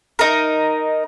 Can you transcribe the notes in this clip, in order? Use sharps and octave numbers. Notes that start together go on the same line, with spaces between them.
D#4 A#4